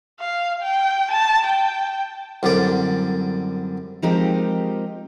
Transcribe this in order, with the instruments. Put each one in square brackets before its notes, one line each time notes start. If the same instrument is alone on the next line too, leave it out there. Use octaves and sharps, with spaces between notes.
[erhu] F5
G5
A5
G5
[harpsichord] C2 F#2 D3 D5
[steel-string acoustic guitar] F3 G#3 C4 D#4 G4 A#4